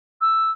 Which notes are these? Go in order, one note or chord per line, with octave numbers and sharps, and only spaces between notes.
E6